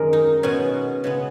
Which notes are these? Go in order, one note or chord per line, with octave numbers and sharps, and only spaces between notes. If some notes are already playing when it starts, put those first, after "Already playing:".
Already playing: F#2 D#3 G#3 A#4
D#4
B2 G#3 B3 C#4
C#3 G#3 B3